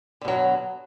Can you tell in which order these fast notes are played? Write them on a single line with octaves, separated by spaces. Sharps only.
D3 B2 F#3